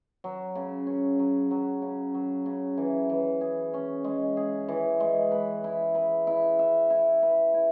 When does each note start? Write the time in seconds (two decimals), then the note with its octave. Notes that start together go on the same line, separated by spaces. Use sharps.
0.24 F#3
0.55 C#3
0.87 C#4
1.19 F#3
1.51 F#3
1.82 C#3
2.14 F#3
2.46 C#3
2.78 E3
3.10 E3
3.41 G#4
3.74 C#4
4.04 G#3
4.37 G#4
4.68 E3
5.00 G#3
5.32 B4
5.64 E4
5.95 B4
6.27 E4
6.59 E5
6.90 E4
7.23 B4
7.54 E4